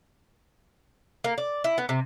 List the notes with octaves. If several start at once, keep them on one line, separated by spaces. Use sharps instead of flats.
A#3
D5
E4
B3
C3